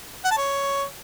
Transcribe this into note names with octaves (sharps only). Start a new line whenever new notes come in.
F#5
A5
C#5